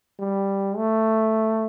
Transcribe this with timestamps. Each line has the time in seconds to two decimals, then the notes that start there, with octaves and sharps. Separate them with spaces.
0.19 G3
0.77 A3